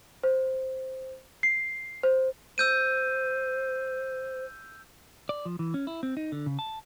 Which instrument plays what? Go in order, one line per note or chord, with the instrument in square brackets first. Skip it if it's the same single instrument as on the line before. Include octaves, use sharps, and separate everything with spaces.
[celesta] C5
C7
C5
[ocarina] C5 [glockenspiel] E6 G6 D#7
[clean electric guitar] D5
F3
E3
C#4
E4
C4
D#4
D3
C#3
A5